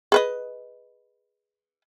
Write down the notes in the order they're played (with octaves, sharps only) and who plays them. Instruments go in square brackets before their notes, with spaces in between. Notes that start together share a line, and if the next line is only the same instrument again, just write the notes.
[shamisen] G#4 B4 D#5